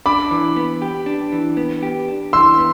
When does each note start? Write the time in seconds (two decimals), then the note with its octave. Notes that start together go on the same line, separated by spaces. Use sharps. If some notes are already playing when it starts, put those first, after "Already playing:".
0.06 D4 B5 D6
0.31 E3
0.56 B3
0.82 G4
1.06 D4
1.32 E3
1.57 B3
1.83 G4
2.08 D4
2.33 E3 C6 E6
2.58 B3